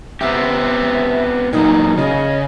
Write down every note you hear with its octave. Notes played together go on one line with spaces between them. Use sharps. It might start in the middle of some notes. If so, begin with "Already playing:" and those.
B3 C4 G4 E5
A#2 F#3 D#4
C#3 D#5